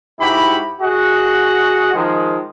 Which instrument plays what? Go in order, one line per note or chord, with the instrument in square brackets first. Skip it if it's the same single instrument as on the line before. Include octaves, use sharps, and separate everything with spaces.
[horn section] G#2 E4 F#4 G4 B5
F#4 G#4 D#5 F#5
D#3 F3 G#3